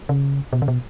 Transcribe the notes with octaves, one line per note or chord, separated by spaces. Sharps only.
C#3
B2
C#3
B2